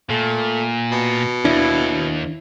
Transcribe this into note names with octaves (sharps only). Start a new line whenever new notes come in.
A#2 A3
B2
D#2 D4 E4